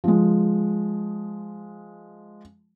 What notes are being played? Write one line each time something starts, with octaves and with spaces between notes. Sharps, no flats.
F3 G#3